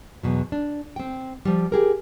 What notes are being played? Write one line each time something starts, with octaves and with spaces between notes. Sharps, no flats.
E2 B2 F#3
D4
C4 G5
F3 G3
G4 G#4 A#4